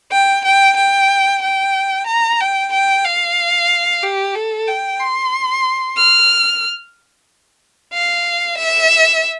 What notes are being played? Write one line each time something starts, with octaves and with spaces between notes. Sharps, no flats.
G5
G5
G5
G5
A#5
G5
G5
F5
G4
A4
G5
C6
F6
F5
E5